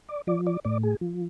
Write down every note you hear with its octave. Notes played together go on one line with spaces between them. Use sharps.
D5
F3 D5
D5
A2 D5
G#4
F3